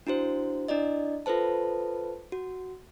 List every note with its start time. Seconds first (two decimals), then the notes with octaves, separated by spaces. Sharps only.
0.07 D4 E4 F#4 C5
0.68 D4 E4 D5 D#5
1.26 F4 A4 B4 C5 A5
2.32 F#4